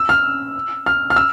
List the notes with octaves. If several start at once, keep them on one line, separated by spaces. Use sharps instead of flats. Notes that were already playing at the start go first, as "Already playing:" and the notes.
Already playing: E6
F6
F6
F6
E6